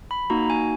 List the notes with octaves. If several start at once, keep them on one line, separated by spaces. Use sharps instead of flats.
B5
A#3 D#4 F#4 A#5
G#5